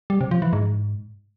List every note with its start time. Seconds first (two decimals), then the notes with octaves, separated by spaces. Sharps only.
0.10 G3
0.21 C3
0.31 F3
0.42 E3
0.53 G#2